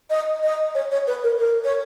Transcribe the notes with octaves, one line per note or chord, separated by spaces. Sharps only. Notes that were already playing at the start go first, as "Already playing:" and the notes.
D#5
D#5
C#5
C#5
B4
A#4
A#4
C#5